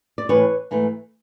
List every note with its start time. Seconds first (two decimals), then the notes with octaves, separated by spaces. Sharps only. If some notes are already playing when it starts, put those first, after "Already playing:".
0.18 D5
0.29 A2 E3 A3 C4 B4 C#5
0.71 G#2 E3 A3